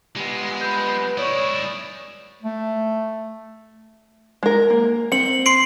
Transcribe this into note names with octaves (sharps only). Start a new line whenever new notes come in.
G3 G#3 B3
B4 G6
G#3 E4 C#5 D5 D#6
A3
G#3 A#4
A#3
C4 C#7 F#7
C6 C7 D7